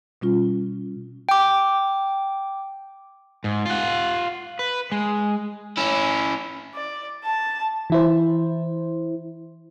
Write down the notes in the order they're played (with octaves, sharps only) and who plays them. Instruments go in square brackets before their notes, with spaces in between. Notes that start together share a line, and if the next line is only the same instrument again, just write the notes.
[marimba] B2 G3 C#4 F4
[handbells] G5 D6
[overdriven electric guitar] G#2
F4 F#5
B4
G#3
C#4 E4
[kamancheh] D5
A5
[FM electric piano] E3 E4 C5